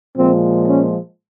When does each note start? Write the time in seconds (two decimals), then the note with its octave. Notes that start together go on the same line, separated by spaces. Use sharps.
0.16 A#2 F3 G#3 C4
0.67 C#4